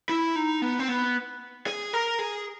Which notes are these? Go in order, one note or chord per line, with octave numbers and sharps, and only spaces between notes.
E4
D#4
B3
C4
B3
G#4
A#4
G#4